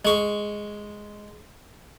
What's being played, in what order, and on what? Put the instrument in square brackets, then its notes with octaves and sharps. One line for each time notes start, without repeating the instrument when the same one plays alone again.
[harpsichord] G#3 C#6